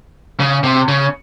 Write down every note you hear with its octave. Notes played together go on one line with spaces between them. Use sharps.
C#3
C3
C#3